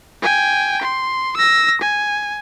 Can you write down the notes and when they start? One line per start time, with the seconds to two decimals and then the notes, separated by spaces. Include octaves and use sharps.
0.22 G5 G#5
0.81 C6
1.37 E6 A#6
1.81 G#5